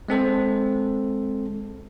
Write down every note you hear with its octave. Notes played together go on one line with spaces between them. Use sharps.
G#3 C4 A4 C5